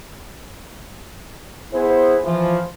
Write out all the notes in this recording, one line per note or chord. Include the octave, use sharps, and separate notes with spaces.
B3 E4 G#4 C5
E3 F3 F4